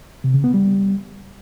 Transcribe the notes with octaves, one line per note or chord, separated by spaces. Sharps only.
C3
C#3
B3
G3